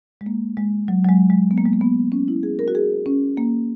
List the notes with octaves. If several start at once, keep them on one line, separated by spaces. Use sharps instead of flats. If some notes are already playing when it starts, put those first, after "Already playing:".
G#3
A#3
G#3
F#3
F#3
G#3
G#3
B3
A#3
G#3
A#3
B3
C#4
E4
G#4
A#4
F#4
G#4
C#4
A#3